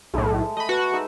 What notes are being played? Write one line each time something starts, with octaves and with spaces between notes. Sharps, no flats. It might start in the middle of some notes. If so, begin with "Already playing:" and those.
B1 A2 G#3 A3
A3 D#5 B5
F#4 B4
G#3 D#4 E6